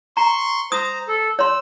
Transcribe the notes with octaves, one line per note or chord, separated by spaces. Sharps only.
A#5 C6 C#6
C5 A#5 D#6
A4
C#5 C6 E6